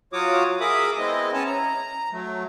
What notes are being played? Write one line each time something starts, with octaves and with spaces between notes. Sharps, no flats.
F#3 F4 F#4 C#5 D6 D#6
G#4 A#4 E5 B5 D6 D#6
G#3 B3 C4 E4 D#5
C#4 C#5 G#5 A5
A#5
F#3 A3